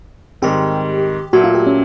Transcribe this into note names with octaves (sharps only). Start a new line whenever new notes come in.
G#2 D#3 G3 C4 G4
A#2 F#3 A3 F#4
F4
G4
C#4